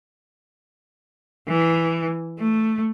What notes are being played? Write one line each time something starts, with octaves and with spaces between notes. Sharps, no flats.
E3
A3